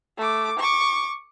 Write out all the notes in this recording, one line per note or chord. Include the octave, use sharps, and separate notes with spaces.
A3 D6
C#6 D6